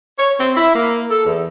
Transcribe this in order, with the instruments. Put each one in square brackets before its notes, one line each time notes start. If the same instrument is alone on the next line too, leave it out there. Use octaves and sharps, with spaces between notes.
[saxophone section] C#5
C4
E4
A#3
A4
E2